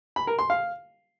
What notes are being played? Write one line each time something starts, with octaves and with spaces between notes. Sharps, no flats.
B5
A#4
C6
F5